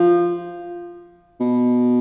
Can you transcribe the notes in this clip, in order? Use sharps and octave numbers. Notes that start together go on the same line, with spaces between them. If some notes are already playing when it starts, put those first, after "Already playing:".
Already playing: F3
B2